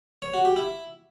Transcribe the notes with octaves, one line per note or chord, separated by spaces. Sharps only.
C#5
F#4
G4
E4